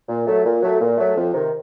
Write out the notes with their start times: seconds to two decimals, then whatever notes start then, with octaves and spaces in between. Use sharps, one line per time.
0.09 A#2
0.27 F#3 A3
0.45 A#2
0.62 F#3 A3
0.81 A#2
0.98 F#3 A3
1.17 F2
1.34 C3 D#3